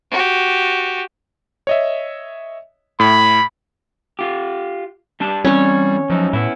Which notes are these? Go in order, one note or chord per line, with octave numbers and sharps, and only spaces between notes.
F#4 G4
C#5 D#5 E5
A2 B5
F4 G4
G3 D4 A5
E3 G3 C4 C#4 C#5
F#2 F3 D#4
A2 B3 E4